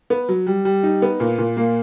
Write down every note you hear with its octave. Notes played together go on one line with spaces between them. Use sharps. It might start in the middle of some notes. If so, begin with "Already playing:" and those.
B3
F#3
G3
G3
D#4
B3
A#2
A#2
A#3